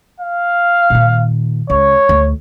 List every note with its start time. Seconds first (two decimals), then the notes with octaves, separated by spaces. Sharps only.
0.20 F5
0.90 A#2 D#3
1.70 C#2 C#5
2.09 D2